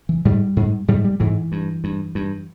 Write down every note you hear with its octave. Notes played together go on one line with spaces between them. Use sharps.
E3
G#2 G3
G#2
G#2 G3
G3
G#2 E3
G2
G2
G2